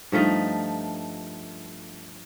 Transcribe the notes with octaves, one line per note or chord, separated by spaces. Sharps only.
G2 F3 A3 D#4